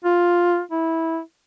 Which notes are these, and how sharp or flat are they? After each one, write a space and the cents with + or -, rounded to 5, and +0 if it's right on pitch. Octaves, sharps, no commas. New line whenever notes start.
F4 +5
E4 -15